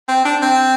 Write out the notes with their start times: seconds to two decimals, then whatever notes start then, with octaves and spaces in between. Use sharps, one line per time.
0.08 C4
0.25 D4
0.42 C4